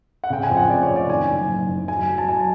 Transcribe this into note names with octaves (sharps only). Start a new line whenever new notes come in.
F#5
C#3 G5
G#5
F2
F#5
F1 D5
C#5
C#3
D5
D#3 G#5
F#1
F#1
F#1
F#3 G#5
F#3
A5
F#3 G#5
A5